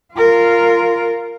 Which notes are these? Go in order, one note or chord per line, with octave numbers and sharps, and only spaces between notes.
F4 A#4